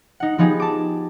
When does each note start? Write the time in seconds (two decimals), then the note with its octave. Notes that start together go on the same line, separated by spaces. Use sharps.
0.20 D#4 F#5
0.38 F3 B3 D#4 G4 G#4
0.60 A5 D6